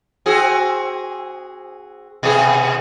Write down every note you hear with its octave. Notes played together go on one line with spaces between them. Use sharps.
C4 F#4 G#4
B2 B3 G#4